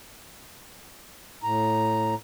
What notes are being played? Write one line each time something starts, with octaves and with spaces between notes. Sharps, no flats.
A2 A#5